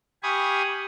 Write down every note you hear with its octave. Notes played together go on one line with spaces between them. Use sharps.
G4 F5 G#5 B5 C#6 D#6